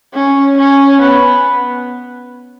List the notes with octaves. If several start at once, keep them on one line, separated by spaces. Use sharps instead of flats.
C#4
C#4
B3